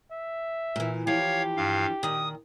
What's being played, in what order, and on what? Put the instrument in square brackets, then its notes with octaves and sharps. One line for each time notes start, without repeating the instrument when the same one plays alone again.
[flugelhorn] E5
[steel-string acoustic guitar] A#2 E3
[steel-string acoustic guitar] E3 F3 [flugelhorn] G4 [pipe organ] C#5 F5
[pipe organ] G2 F5
[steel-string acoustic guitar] A#2 D#3 [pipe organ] D#6